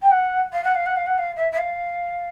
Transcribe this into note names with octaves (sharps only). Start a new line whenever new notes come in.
G5
F#5
F5
F#5
F5
F#5
F5
F#5
F5
E5
E5
F5